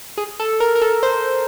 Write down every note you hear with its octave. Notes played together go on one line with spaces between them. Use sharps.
G#4
A4
A#4
A#4
A4
C5